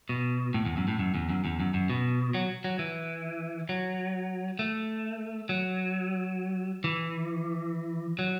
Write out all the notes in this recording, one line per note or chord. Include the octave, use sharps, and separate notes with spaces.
B2
A2
E2
F#2
A2
F#2
E2
F#2
E2
F#2
F#2
B2
F#3
F#3
E3
F#3
A3
F#3
E3
F#3